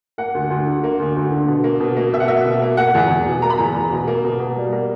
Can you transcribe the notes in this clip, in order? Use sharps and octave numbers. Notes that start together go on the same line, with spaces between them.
A#3 F#5
D2
D2
D3
A#3
D2
D2
D3
B2
A#3
B2
A#3
B2 E5
F#5
A#3 E5
B2
A#3
A#3 F#5
E2
E2
B2
A#3 A#5
B5
E2 A#5
E2
B2
A#3
B2
B2
G3
A#3